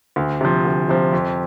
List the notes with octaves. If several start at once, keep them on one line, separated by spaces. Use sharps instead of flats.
D2
C3 F3
D2
C3 F3
F2